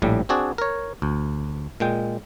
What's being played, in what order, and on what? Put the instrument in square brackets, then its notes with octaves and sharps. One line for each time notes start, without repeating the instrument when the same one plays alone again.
[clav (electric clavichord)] A#1 A2 G3
C4 D4 F#4 G#4 D5
A#4 C#5
D2
A#2 G#3 G5